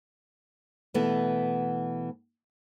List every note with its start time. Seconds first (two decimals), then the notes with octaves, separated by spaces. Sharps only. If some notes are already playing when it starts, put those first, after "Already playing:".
0.94 B2 E3 A3 B3